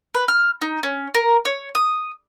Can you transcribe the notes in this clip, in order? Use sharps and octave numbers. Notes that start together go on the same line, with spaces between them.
B4
F6
D#4
C#4
A#4
C#5
D#6